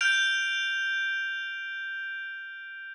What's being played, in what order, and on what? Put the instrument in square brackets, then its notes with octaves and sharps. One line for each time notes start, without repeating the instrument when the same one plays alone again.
[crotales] F6 G6 D7 F7